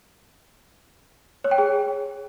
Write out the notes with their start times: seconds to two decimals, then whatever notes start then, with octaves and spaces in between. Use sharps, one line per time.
1.44 C#5
1.51 G5
1.58 G#4